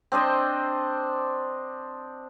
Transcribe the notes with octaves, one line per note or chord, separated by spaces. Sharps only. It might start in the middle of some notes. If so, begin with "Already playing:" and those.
C4 D4 C5 D#5